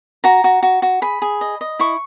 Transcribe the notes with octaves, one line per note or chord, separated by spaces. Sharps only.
F#4 A#5
F#4
F#4
F#4
G#4 B5
G#4
D#5
D#5
E4 C#6